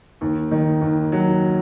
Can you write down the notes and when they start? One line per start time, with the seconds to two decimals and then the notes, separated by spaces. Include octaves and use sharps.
0.21 D#2
0.51 D#3
0.81 D#2
1.12 F#3